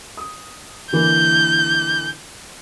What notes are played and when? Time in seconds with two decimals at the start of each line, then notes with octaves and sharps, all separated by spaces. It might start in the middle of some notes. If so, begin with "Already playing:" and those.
0.17 D#6
0.93 D3 E3 A#3 G6